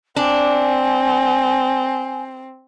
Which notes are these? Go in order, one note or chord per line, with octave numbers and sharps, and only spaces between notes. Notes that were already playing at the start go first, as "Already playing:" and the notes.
C4 D4 G#5